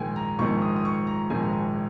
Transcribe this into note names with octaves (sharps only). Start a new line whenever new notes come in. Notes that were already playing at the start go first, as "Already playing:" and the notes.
Already playing: A#1 G#2 D#3 G#3 G5 G#5
A#5
A#1 G#2 D#3 G#3 C#6
D#6
D#6
C#6
A#5
A#1 G#2 D#3 G#3 G#5
A#5
G#5